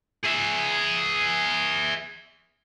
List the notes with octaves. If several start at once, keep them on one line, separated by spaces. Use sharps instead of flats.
G#4 E5